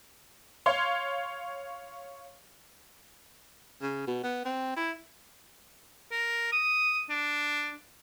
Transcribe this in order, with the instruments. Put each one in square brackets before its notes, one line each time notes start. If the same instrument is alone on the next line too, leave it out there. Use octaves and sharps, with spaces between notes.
[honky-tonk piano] C#5 F5 C6
[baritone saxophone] C#3
B2
B3
C4
E4
[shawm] A#4
D#6
D4